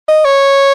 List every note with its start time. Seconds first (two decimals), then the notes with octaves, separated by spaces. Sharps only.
0.08 D#5
0.25 C#5